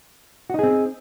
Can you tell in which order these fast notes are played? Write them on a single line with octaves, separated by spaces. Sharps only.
F#4 D#4 G#4 C4